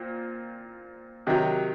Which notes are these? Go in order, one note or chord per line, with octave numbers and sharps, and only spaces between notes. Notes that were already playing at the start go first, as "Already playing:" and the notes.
Already playing: A#2 C4
C3 D#3 F#3